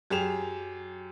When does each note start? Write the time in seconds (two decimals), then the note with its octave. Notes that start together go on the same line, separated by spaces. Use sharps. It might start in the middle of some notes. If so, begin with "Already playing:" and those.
0.10 F#2 G4 G#4 E7 F7